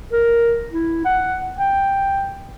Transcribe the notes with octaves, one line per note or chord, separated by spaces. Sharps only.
A#4
E4
F#5
G5